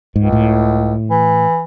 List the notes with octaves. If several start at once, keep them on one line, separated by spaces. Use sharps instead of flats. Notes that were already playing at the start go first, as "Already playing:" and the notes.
C#2 G#2
A2
E3